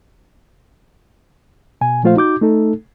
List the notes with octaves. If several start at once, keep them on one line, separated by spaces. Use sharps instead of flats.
B2 G#5
A#2 F3 A3 F4 C5 F5
D#4 F#4 D6 G6
A3 D#4 A4